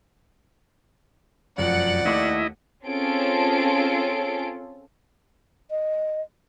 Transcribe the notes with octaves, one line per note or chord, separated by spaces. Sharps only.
F1 F#2 F3 D5 F#5
D#2 A3 E4 D#5 D6
C4 C#4 F4 G#4 A4 D7
D#5